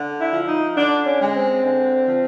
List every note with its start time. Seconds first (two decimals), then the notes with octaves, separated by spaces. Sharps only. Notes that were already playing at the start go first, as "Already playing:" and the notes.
Already playing: D3
0.19 E4
0.33 F3
0.48 D#4
0.77 D3 D4
1.06 C#4
1.21 G#3
1.36 C4
1.64 D3
2.08 F3